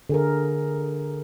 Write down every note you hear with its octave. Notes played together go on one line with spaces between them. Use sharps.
D3 G#4 A#4